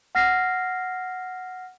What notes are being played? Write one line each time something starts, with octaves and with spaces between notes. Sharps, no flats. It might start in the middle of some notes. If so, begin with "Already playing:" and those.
F#5 F6 A#6 C7